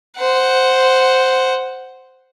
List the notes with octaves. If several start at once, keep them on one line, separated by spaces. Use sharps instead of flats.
C5 F#5